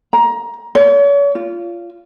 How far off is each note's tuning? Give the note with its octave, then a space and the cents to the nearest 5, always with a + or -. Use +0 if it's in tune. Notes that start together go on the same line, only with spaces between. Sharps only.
A#5 +20
C#5 +40
F4 -15